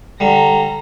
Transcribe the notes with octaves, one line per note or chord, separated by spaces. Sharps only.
D3 G3 A#5